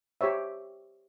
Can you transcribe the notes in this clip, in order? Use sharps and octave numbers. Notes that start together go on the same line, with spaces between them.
G4 C5 C#5 E5